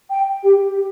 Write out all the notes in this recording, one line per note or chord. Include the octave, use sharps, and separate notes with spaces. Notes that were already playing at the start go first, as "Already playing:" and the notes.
G5
G4
G4